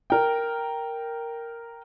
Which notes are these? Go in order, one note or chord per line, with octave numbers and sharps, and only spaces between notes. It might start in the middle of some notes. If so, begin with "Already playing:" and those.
A#4 G5